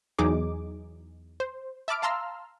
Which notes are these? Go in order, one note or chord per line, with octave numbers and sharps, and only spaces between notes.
E2 F#3 D#4 G#4 D6
C5
E5 A5 B5 D6 F6 D7
F5 A5 A#5 C6 E6 F6